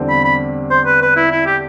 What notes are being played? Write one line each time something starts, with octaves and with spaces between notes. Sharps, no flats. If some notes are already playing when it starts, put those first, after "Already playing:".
Already playing: E2 D3 G3 C4
B5
B5
C5
B4
B4
E4
E4
G4